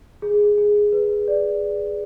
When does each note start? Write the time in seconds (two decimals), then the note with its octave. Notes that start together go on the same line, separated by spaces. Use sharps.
0.22 G#4
0.58 G#4
0.93 B4
1.28 D5